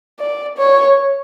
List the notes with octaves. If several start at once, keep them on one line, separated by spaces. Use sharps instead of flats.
D5
C#5